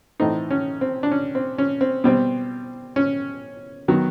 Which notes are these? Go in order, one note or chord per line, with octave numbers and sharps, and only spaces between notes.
A2 E3 A3 C4 D#4
C#4
C4
D4
C#4
C4
C#4
C4
B2 G3 C4
C#4
D#3 F#3 B3